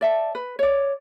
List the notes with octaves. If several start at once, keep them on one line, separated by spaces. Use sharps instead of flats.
D5 E5 A5
B4
C#5 D5